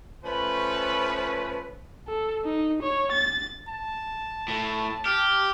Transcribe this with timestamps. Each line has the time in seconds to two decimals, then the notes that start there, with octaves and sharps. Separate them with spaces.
0.25 F3 A3 C#4 B4
2.08 A4
2.45 D#4
2.82 C#5
3.12 A6
3.68 A5
4.48 A2
5.05 G4 F6